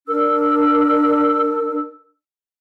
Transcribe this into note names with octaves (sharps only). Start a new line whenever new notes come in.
D4 A#4 E6